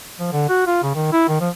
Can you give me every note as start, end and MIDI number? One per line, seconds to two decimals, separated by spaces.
0.19 0.30 53
0.32 0.48 50
0.49 0.63 66
0.67 0.79 65
0.83 0.91 49
0.95 1.09 51
1.12 1.25 64
1.28 1.39 51
1.40 1.49 53